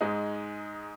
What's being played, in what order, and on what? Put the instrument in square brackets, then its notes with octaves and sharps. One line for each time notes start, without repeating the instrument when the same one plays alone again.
[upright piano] G#2 G#3 D#4